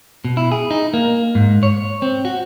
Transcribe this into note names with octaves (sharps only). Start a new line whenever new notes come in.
B2
E4
G#4
D#4
A#3
G#2
C#5
C4
F#4